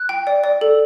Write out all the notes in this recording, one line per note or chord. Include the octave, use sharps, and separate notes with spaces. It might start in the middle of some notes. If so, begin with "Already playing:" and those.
Already playing: F#6
G5
D5
D5
A4